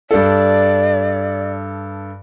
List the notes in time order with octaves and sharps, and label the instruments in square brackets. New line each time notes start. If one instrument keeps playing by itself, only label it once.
[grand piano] G2 A4 [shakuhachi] D5